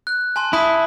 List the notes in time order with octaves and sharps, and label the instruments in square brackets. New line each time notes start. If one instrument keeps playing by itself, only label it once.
[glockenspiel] F#6
G#5 A5 C6
[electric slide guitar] E4 [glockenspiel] A5 D#6 B6